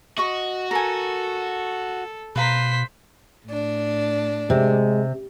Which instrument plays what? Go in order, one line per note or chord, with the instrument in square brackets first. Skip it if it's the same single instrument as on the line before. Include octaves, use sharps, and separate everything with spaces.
[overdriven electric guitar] F#4 [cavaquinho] D#5 C#6
[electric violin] A4 [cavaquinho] A#4 G#5
[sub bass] B2 [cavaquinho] B4 F5 A#5 [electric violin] C5 B6
[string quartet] A2 D4
[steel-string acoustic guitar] C3 [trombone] G#3